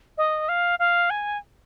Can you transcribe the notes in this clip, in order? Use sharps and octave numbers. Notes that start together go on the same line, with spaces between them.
D#5
F5
F5
G#5